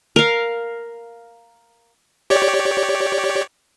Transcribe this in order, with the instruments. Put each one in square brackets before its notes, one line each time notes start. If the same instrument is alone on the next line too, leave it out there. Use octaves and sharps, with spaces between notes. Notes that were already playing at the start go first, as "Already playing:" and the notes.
[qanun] A#4 F5
[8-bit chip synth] G4 C#5 D5